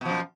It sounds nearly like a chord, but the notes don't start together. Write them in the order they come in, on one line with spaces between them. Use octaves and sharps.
B2 F3 F#2